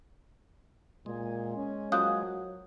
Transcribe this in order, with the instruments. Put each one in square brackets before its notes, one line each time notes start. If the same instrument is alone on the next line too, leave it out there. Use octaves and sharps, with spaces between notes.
[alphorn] A#2 [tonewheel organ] G#3
[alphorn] C#4
[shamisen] F3 A#3 F4 [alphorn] F#3 [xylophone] D#6 F#6 G6